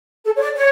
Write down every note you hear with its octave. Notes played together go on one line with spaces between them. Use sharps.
A4
C#5
D5
C#5